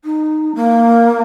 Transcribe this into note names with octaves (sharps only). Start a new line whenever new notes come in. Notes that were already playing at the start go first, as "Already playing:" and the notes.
D#4
A#3